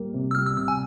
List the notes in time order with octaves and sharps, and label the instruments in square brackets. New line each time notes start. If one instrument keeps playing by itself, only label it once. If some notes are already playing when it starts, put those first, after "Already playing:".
Already playing: [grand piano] G3 A#3
C3
[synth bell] E6
[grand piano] G3 [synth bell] F6
[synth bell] E6
[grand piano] C3 [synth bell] E6
[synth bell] G#5